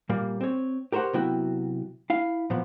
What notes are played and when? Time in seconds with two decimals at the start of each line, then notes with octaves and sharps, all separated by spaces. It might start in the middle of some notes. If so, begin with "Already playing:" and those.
0.09 A#2 G3 A#3
0.41 C4 C#5
0.92 G4 A#4 C5 C#5 F#5
1.13 C3 F#3 B3 E4 F#4 G5
2.10 E4 F5
2.50 A#2 F3 B3